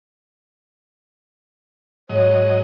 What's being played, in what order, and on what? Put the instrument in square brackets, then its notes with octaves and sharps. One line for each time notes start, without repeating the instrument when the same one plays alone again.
[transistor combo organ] G#2 F#3 D#5 [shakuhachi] C#5